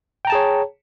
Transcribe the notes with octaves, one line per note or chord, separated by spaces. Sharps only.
G#4 C#5 G5 A5 A#5